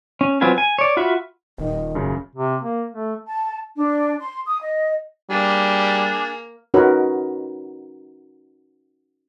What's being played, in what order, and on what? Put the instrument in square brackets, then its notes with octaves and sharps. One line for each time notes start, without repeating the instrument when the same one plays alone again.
[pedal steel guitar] C#4
F#3 C4 F4 B4 G#5
G#5
C#5 D5
F4 F#4 E5 B5 C#6
[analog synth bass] D#1 [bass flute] D#3
[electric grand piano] F#2 C#3
[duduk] C3
A#3
A3
[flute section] A5
D4
C6
D#6
D#5
[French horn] G3 [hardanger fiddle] A#3 [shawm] D4 [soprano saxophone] G#4
[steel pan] C#4 D#4 F#4 A#4 B4 C#5